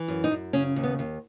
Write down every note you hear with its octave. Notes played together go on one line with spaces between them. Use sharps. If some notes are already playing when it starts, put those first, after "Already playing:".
Already playing: E3
F#2
D#4
F#2
C#3 C#4
D#2
B3
D#2